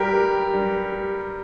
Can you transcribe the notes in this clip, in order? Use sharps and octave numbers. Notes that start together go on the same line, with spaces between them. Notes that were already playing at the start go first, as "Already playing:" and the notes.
Already playing: G2 G4 A#4
G3
G2
G3